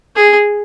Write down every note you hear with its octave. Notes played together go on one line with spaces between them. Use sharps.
G#4